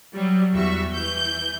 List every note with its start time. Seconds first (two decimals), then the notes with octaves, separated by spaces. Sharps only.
0.14 F#3 G3
0.54 E2 G3 F#4 E5 C#6
0.92 E3 G6